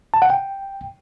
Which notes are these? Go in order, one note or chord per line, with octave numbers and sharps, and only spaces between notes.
A5
F#5
G5